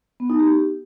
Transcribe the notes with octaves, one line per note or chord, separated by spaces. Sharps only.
B3
D#4
G4